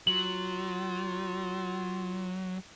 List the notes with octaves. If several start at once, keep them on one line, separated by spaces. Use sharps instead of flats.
F#3 F4 F#7